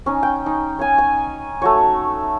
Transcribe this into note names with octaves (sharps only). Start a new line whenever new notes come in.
C#4 D#4
G5
D#4
C#5 F#5 G#5
G#5
A3 F#4 C#5